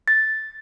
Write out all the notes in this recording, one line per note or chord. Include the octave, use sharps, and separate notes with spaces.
A6